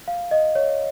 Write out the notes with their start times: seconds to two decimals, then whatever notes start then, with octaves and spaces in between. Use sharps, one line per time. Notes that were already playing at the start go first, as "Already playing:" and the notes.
0.08 F5
0.31 D#5
0.55 C#5